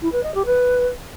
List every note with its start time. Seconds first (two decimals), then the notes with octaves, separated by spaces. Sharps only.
0.01 E4
0.12 B4
0.23 D#5
0.34 G4
0.45 B4